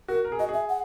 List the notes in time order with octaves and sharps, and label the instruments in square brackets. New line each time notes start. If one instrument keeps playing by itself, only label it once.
[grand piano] F#4 [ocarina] A#4
[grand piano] A#4
G#4
[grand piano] F#4 [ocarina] D#5
[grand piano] G#4 [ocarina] E5
[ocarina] F#5